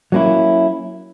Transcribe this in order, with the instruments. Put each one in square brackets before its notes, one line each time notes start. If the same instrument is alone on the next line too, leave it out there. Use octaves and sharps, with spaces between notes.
[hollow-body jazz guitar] F#3 A#3 C#4 E4